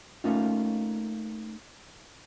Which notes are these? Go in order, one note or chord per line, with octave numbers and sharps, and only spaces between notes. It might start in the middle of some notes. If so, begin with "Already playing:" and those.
A3 A#3 C#4 D#4 F4